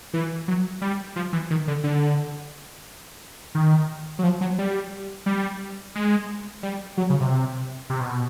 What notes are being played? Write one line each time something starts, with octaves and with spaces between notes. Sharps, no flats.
E3
F#3
G3
F3
E3
D#3
D3
D3
D#3
F#3
F3
F#3
G3
G3
G#3
G3
F#3
C#3
C3
C3
B2